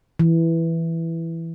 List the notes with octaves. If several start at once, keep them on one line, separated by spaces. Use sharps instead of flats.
E3